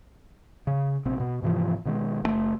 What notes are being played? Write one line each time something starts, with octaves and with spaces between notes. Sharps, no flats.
C#3
A#1 C3 C4
A1 B2
G#2 C3 E3 F3
B2 D#3 G#3
F#1 C#3 A3